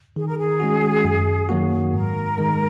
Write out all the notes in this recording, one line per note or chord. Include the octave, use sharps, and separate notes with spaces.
D#3 G#4
A#4
G#4
G#3 C#4 F#4
F#2
D#3 F#3 A#3 F#4
G#2 A#4
D#3 G#3